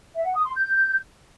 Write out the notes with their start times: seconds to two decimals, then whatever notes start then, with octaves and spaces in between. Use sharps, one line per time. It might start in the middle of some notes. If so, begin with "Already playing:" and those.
0.15 E5
0.25 F#5
0.35 D#6
0.45 C6
0.55 G6